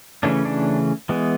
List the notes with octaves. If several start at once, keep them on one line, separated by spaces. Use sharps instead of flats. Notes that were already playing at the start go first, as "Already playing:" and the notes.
C#3 E3 A3 C#4 D4
D4
E3 G#3 B3